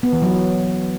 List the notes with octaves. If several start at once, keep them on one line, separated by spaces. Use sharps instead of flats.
B3
E3
F#3